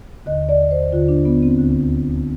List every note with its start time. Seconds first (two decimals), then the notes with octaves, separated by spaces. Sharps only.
0.26 D#2 D3 D#5
0.49 D5
0.71 C5
0.92 D#2 D3 F4
1.08 D4
1.25 B3
1.43 C4
1.59 D2 D3